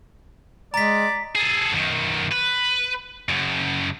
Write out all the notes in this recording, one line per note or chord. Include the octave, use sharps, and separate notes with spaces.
G#3 D5 A#5 B6
G#4 A4
F#2 D#3
B4
F#2 C#3